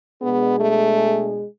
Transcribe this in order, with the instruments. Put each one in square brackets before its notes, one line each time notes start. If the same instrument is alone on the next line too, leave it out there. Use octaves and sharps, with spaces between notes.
[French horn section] B2 G#3 D4 G#4 [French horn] B3
[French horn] A3